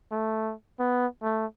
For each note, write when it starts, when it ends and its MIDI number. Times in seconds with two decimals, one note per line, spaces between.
0.11 0.53 57
0.80 1.06 59
1.23 1.46 57